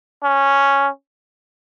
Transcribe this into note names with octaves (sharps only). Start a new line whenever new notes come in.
C#4